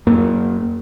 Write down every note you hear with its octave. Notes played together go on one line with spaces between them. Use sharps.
F#2 A#3